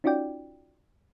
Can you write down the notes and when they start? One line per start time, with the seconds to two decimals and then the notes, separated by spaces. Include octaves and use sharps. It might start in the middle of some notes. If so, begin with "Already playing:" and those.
0.04 C#4 D#4 F4 F#4 D5 G5